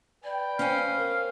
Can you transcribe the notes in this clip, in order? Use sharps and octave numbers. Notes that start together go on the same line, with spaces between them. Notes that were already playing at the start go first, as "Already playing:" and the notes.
B4 D5 G5
C#4 C5 F5 G#5
A#4